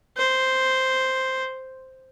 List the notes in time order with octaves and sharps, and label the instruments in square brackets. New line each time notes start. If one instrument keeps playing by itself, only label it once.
[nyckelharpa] C5